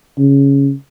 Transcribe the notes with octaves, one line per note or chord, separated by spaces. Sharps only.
C#3